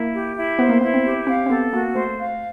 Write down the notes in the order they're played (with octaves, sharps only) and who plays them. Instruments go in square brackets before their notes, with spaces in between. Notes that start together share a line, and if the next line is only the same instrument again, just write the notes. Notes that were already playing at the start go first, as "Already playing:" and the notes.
Already playing: [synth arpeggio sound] A#3 [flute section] E4
[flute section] G4
E4
[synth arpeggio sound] B3 [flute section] C5
[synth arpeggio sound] A#3
[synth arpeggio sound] B3 [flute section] E4
[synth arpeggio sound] C4
[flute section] G4
[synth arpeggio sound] C4 [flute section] F5
[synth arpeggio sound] C4
[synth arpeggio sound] B3 [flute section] A4
[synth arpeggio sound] A#3 [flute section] F#4
[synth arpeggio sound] A3 [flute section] C5
[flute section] F5